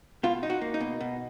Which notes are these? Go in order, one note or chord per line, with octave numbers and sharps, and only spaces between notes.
B2 F4
D#4
F#4
A#3
D#4
B2
B2